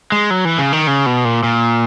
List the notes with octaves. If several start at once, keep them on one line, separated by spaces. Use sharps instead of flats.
G#3
F#3
E3
C#3
D#3
C#3
B2
A#2
A#2